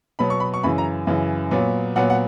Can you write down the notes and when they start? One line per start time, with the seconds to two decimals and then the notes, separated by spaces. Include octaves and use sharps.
0.19 B2 F#3 B3 B5
0.30 C#6
0.40 B5
0.54 C#6
0.63 F#2 C#3 E3 B5
0.78 A#5
1.07 F#2 C#3 E3
1.51 A#2 F#3 B3
1.96 A#2 F#3 B3 F#5
2.10 F#5